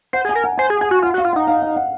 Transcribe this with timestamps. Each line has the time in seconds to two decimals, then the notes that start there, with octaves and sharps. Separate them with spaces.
0.13 C5 F#5
0.25 G#4
0.29 G#5
0.35 A#4
0.44 F#5
0.58 C5 G#5
0.70 G#4
0.81 G#4 G#5
0.91 F#4
1.02 F4 F#5
1.14 F#4
1.18 F5
1.24 F4
1.33 D#4 F#5
1.47 F5
1.62 F5
1.76 F#5